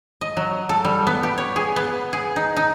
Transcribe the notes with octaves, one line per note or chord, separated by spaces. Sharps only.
D#5
F#3
A4
G3
B3
G4
C#5
G#4
B3
G#4
D#4
D#4